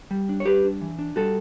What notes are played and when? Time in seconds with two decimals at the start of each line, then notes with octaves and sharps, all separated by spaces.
0.11 G3
0.29 D4
0.40 C#5
0.45 G3 G4 B4
0.64 D4
0.81 E3
0.99 D4
1.16 G3 F#4 A4